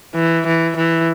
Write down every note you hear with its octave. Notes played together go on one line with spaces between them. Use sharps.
E3
E3
E3